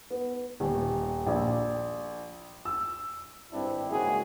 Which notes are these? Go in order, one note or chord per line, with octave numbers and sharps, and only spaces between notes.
B3
D#1
A#1
E6
G#1 G2 C4 D4 E4
G2 C#3 G#3 A#3 F#4 G#4